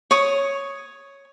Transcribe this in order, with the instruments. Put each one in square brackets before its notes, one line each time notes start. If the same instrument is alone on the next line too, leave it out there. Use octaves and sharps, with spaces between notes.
[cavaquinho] C#5 D#6